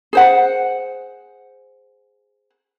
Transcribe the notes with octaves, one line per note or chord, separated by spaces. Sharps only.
G#4 C5 F#5